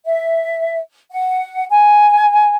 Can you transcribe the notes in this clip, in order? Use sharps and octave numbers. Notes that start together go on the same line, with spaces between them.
E5
F#5
G#5